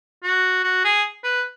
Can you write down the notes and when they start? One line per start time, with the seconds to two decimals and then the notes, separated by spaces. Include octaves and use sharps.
0.23 F#4
0.64 F#4
0.85 G#4
1.24 B4